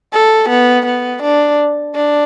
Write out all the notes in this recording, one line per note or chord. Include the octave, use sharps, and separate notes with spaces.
A4
B3
B3
D4
D4